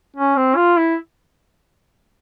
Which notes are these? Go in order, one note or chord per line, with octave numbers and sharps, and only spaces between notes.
C#4
C4
F4
E4